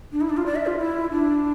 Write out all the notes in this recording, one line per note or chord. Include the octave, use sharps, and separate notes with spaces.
D4
E4
D4
F4
D5
E5
F4
E4
D4